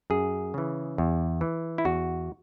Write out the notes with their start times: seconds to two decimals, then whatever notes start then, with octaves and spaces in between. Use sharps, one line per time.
0.10 F#2 G#4
0.54 C#3 E3
0.98 E2
1.41 E3
1.78 E4
1.85 E2 F#4